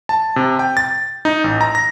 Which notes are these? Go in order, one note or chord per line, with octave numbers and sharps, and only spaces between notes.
A5
C3
G5
A6
D#4
A1
A#5
A#6